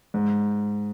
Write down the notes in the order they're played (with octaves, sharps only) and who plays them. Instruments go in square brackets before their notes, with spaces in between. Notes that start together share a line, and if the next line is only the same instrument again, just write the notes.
[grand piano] G#2